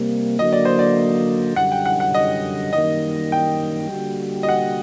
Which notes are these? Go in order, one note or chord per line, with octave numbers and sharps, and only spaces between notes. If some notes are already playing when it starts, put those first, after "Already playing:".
Already playing: C3 G3 A#3
D3 F#3 A#3 D#5
D5
C5
D5
F#2 D3 G3 F#5
G5
F#5
F#5
D#5
F#2 D#3 G3 A#3 D#5
G5
D3 G3 A#3 F#4
D#5
F#5